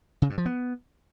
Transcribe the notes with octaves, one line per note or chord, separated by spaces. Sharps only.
C#3
G2
F3
B3